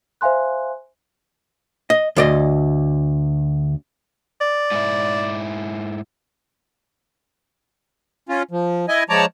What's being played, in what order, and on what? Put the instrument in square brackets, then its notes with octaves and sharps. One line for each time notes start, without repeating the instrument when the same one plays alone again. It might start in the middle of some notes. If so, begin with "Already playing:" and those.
[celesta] C5 E5 F5 G#5 C6 F#6
[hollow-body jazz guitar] D#5
D2 D5 D#5
[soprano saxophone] D5
[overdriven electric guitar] G#2 E4
[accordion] C#4 F4
F3
E4 D#5 G#5
F3 G#3 C#5 D5 A5 A#5